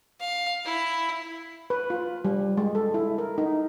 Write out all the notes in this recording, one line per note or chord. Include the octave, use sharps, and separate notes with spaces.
F5
E4
B4
F4
G3
G#3
A4
E4
A#4
D#4